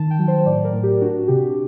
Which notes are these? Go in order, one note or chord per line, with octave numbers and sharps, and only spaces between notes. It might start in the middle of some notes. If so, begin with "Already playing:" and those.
Already playing: D#3 A5
G5
F#3
C5
A2 D5
A#4
A2
G4
D4 F#4
C3 G4